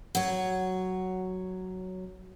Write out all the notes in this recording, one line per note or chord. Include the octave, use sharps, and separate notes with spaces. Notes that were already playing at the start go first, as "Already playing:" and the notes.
F#3 C#5